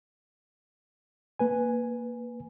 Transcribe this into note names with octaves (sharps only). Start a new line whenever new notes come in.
A#3 B4 G#5